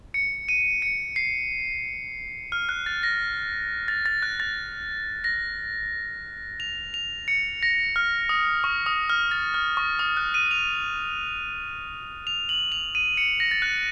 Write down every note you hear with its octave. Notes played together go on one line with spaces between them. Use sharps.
C#7
D#7
C#7
C7
F6
F#6
A6
A#6
A6
A6
F#6
A6
A#6
F7
F7
C#7
A#6
F6
D#6
C#6
D#6
F6
A6
F6
C#6
D#6
F#6
D#7
F7
F7
F#7
F7
D#7
C#7
A#6
A6
F#6